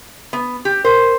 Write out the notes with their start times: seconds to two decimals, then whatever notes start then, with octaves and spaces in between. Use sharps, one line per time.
0.33 B3
0.65 G4
0.85 A#4 C5